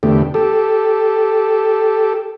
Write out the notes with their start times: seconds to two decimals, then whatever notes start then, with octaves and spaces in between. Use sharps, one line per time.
0.03 E2 D3 A3 G4
0.34 G4 A4